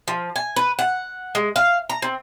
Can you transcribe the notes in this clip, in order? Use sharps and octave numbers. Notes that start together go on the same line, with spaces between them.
F3
G#5
B4
F#5
G#3
F5
A#5
C4